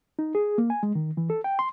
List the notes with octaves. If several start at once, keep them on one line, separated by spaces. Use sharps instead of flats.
D#4
G#4
A#3
G#5
G#3
D#3
E3
A4
G5
C6